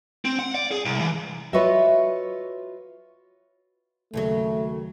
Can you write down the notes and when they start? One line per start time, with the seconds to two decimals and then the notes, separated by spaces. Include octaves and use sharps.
0.25 C4
0.39 F#5
0.54 D5
0.71 G#4
0.85 C2
1.00 E3
1.53 F4 F#4 B4 C#5 D#5 E5
4.14 D#2 C#3 F#3 A3